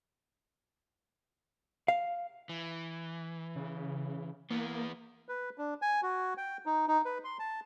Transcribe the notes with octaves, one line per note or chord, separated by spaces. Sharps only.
F5
E3
C#3
E3 A#3 B3
B4
D4
G#5
F#4
G5
D#4
D#4
B4
C6
A5